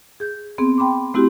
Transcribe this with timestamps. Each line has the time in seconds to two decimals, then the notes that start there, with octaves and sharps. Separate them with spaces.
0.20 G#4 G6
0.58 B3 C4 G#4
0.78 G5 B5 C6 D6
1.14 A3 C4 E4 F#4 G4